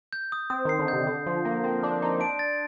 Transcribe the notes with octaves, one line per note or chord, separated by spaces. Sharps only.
G6
D#6
C4 D#6
D#3 C7
D3
C3 G6
D3 D#6
F3 C6
A#3 A#6
C4 A5
D4 D#6
D#4 C6
D4 D7
A6